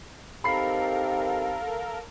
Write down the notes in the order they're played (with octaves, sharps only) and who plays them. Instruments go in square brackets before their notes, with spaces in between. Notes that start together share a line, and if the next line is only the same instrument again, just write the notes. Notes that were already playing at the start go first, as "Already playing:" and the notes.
[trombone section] C4 D#4 G4 [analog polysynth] A4 A#4 [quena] F5 [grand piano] B5 C7